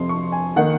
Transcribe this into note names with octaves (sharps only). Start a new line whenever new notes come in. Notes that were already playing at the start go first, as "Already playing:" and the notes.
Already playing: F2 C3 F3 C4 C6
C#6
G#5
D#3 A#3 F#5